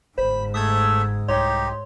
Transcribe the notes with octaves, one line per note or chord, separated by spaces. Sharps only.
G1 G#2 C5 B5
A3 E5 D#6 E6 G#6
C2 D#4 G4 C#5 C6